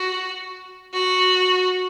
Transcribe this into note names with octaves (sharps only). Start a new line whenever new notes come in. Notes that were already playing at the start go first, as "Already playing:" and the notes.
Already playing: F#4
F#4